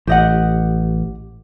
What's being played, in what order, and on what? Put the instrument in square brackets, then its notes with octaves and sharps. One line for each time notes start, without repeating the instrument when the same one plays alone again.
[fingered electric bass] A1 [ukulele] G4 D#5 F#5